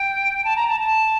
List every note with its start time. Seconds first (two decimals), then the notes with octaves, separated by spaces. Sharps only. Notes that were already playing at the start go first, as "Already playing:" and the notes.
Already playing: G5
0.44 A5
0.56 A#5
0.68 A5
0.80 A5